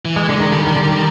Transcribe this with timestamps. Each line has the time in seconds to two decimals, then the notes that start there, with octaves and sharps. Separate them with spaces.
0.05 E3
0.16 G#3
0.28 D3 G#3
0.40 D#3
0.52 D3 G3
0.67 D#3
0.76 D3
0.83 D#3